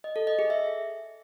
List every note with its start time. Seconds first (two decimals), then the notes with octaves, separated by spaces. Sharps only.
0.04 D#5
0.16 A4
0.27 D#5
0.39 G#4
0.50 E5